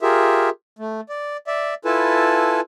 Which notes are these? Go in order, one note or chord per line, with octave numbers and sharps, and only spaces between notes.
F4 G4 G#4 A#4 E5
A3
D5
D5 E5
E4 F4 A4 B4 G#5 A5